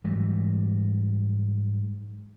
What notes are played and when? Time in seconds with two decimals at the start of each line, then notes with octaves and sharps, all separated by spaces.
0.04 G#2 E3 F#3 G3